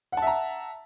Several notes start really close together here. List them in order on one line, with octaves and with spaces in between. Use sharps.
F#5 A5 E5 A#5